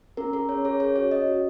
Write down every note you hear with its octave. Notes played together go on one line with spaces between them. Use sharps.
C#4 A#4
G#4 A#4
C#4 C#5
G#4 C#5
C#4 C#5
F#4 C#5
C#4 D#5
F#4